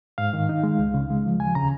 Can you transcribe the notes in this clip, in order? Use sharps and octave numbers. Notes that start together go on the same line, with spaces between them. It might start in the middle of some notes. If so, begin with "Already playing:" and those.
G#2 F5
D#3
D#4
G#3
C#2
C#3
G#3
F3
D#2 G#5
C#3 A#5